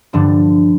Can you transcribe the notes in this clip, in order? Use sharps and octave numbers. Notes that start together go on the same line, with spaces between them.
G2 D3 F3 D4